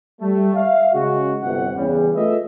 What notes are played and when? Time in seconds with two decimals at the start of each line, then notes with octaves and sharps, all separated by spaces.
0.21 G3 A3
0.55 E5 F5
0.93 C#3 G#3 F#4
1.42 G1 C3 F#5
1.76 E2 C#3 G3
2.16 A3 F4 A4 B4 D#5 E5